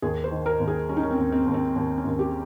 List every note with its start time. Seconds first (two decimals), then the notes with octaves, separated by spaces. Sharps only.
0.02 D#2 G#4
0.24 C5
0.31 D#3
0.46 A#4
0.60 D#2
0.68 G#4
0.89 G3 C#4
0.97 D#4
1.03 C#4
1.11 C4
1.18 D#2
1.32 C4
1.47 D#2
1.54 C4
1.76 D#2
1.98 C#4
2.05 D#2
2.19 G4